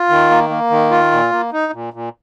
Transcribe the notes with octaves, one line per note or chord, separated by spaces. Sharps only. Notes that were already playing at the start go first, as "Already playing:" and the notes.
Already playing: F4
D#3
A#3
A#3
D#3
F4
A#2
A#3
D#4
A#2
A#2